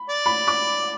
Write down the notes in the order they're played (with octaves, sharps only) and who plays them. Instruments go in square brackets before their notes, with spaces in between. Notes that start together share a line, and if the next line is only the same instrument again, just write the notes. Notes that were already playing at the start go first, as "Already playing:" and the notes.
Already playing: [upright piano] B5
[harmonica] D5
[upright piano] B5
D6